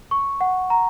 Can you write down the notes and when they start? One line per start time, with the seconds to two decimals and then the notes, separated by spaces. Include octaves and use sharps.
0.11 C#6
0.41 F#5
0.70 A#5